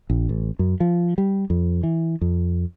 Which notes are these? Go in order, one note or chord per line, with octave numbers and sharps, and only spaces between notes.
A#1
A1
F#2
F3
G3
F2
E3
F2